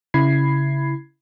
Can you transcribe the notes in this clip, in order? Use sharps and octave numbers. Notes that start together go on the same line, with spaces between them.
C#3 E4 B5 G#6 C7